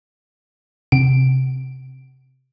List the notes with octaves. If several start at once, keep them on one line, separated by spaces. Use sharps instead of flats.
C3 D7